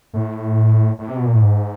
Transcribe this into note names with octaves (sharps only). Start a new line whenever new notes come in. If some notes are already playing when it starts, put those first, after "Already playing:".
A2
A2
C3
B2
A#2
A2
G#2